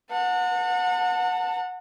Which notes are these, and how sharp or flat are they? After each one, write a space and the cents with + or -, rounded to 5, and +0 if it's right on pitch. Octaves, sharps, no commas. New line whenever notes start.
F#5 -25 A5 +40